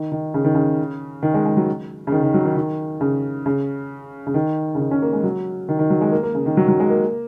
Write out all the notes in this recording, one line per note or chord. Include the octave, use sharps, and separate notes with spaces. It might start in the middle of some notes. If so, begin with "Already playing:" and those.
Already playing: D#3
D#3
C#3
D#3
C#3
D#3
G#3
G#3
F#3
C#3
D#3
D#3
F#3
D#3
D#3
C#3
C#3
C#3
D#3
C#3
D#3
C#4
A#3
G#3
F#3
D#3
D#3
F#3
G#3
A#3
A#3
C#3
D#3
F#3
F#3
G#3
A#3